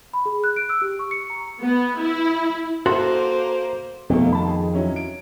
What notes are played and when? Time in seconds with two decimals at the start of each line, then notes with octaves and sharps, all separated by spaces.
0.13 B5
0.26 G#4
0.44 F#6
0.56 D7
0.69 E6
0.82 G4
0.99 C#6
1.11 C#7
1.30 A#5
1.62 B3
1.99 E4
2.86 A#3 F#4 A4 C5 E5 C6
4.10 F2 B2 D#3 A3 A#3
4.32 A5 B5
4.47 G#4
4.74 F#3 C#4 E4
4.96 D7